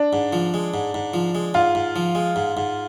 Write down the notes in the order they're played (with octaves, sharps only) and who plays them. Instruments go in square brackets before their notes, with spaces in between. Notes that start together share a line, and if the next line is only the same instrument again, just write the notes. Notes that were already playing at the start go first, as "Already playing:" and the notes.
Already playing: [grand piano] D4
[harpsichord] G#2
F3
G#3
G#2
G#2
F3
G#3
[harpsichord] G#2 [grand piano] F4
[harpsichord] G#2
F3
G#3
G#2
G#2